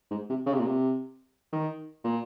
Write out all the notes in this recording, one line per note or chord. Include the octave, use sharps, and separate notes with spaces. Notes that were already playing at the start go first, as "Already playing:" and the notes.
G#2
C3
C#3
C3
A#2
C3
D#3
A#2